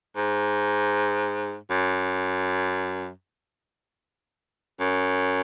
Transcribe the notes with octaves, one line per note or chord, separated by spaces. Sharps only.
G#2
F#2
F#2